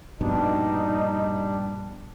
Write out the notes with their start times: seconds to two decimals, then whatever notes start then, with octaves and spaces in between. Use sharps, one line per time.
0.21 A#1 G2 B2 G3 D4 D#4